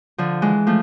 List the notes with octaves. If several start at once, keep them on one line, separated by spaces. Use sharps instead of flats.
D3 F3
E3 G#3
F3 A3